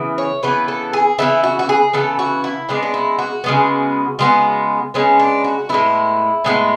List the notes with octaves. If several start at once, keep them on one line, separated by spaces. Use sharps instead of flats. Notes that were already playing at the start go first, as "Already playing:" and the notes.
Already playing: C#3 E3 B3
C#5
C#3 E3 B3 B4
A4
G#4
C#3 E3 B3 E4
F#4
F#4
G#4
C#3 E3 B3 A4
F#4
E4
C#3 G#3 B3 D4
D4
E4
F#4
C#3 G#3 B3
C#3 G#3 B3
C#3 G#3 B3 C#4
D4
F#4
A2 G#3 B3 E4
A2 G#3 B3